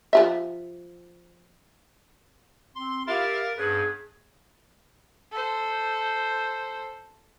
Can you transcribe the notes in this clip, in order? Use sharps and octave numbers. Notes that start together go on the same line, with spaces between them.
F3 G4 E5
C4 C6
E4 G4 A#4 F5 A6
G2 B3 C#4 G#4 B4
A4 C5